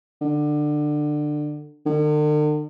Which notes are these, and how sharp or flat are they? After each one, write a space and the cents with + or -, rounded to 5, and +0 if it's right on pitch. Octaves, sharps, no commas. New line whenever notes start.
D3 +20
D3 +45